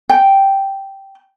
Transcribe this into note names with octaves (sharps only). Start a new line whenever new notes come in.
G5